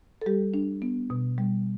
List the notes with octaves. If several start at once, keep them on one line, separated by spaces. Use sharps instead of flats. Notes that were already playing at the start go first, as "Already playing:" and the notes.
A4
G3 G4
D4
B3
B2
G3